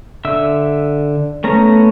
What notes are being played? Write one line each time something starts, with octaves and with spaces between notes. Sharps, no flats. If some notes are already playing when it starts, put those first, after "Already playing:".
D3 E5 E6
A3 B3 C#4 A#5